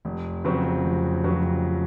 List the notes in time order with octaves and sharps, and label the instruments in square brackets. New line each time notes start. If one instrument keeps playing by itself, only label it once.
[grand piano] F1
F2 C#3 F#3 C4
F1
F2 C#3 F#3 C4